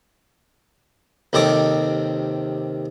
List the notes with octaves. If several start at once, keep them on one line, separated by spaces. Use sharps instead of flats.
D#2 C3 D#3 A4 A#5 D6